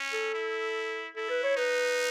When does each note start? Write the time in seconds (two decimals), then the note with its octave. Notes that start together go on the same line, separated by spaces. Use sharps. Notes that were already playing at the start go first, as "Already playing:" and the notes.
Already playing: C#4
0.13 A4
0.34 E4
1.15 E4 A4
1.30 B4
1.44 C#5
1.56 D#4 B4